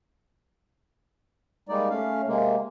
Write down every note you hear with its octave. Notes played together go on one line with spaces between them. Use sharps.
G3 G#3 A#3 D#4 D5
A3 C#4 F5
C3 G#3 A#3